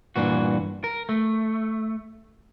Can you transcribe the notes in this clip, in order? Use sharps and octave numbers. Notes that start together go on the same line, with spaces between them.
G2 A#2 E3 F#4
A#4
A3